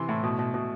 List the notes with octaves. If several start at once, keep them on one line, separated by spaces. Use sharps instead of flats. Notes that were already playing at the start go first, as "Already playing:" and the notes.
Already playing: C3 E3 C6
A2
B2
B2
B2